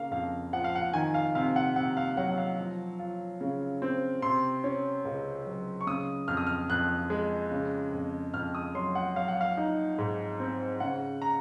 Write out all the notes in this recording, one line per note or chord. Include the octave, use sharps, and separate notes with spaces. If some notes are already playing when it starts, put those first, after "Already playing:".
Already playing: C#3 A#3 F5
F2 F5
F3 F#5
F5
F#5
D#3 G#5
F5
C3 F5
F#5
C3 F#5
F5
F#3 F#5
F#5
F5
F3
F4
C#3
C4
C3 C6
C#4
C#2
F#3
C#6
C#3 D#6
F2 F6
D#6
F6
F2 F#6
G#3
C#3
F2
F2 F6
D#6
F#3 C6
F#5
F#3 F5
F#5
F5
D#4
G#2
C4
C#3 F#5
A#5